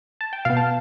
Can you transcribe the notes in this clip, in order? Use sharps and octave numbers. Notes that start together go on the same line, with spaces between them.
A5
G5
B2 B3 F5
A5